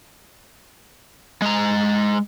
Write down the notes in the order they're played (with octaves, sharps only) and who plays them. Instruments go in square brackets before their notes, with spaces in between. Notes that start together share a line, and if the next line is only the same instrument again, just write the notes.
[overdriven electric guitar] G#3 A#5